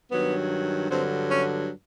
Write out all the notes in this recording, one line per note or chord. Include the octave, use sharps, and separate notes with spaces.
G2 D#3 F#3 B3
G2 D3 F#3 C4
C#4